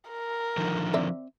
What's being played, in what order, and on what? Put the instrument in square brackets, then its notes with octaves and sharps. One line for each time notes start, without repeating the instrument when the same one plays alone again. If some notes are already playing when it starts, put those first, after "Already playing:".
[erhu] A#4
[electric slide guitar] D3 D#3 F3
[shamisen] C4 D5 E5